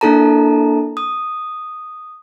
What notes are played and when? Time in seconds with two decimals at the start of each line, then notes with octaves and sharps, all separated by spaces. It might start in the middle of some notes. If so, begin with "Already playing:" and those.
0.01 A#3 D4 E4 A4 A5 A#5
0.97 D#6